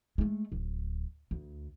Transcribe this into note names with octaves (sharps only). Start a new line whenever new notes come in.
G#3 A3
D1
D2